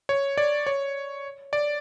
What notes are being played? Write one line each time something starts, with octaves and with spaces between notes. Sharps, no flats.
C#5
D5
C#5
D5